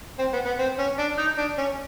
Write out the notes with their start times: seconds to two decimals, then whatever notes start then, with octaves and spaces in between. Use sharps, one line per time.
0.19 C4
0.33 B3
0.46 B3
0.59 C4
0.79 C#4
0.99 D4
1.18 D#4
1.38 D4
1.58 C#4